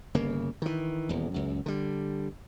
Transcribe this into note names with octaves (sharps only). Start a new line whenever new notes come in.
G1 C#3 A#3
D#3 E3
D#1 E2
C#2 F#2
D3 G3